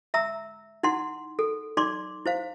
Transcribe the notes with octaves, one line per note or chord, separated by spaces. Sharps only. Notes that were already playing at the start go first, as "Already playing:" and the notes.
E5 A#5 E6
D#4 E4 F#5 C6
A4
D#4 D5 C6 D6
E4 C5 F5